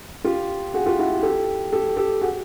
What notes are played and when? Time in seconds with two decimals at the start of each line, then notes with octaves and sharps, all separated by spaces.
0.24 F4 G4
0.74 F#4 G#4
0.86 F4 G4
0.99 E4 F#4
1.23 G4 A4
1.72 G4 A4
1.97 G4 A4
2.21 F#4 G#4